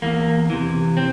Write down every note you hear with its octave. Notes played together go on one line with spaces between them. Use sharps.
E2 A#3
C3 E3
C4